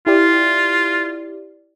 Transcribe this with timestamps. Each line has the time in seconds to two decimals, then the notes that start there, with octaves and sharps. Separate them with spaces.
0.07 E4 F4 G4 D5